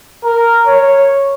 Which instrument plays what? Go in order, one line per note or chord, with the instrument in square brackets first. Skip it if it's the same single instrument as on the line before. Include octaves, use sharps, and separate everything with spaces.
[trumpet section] A#4
C#5